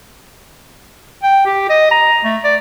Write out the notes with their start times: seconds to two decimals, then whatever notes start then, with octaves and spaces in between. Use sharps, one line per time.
1.23 G5
1.46 G4
1.70 D#5
1.91 A#5
2.25 A3
2.44 D5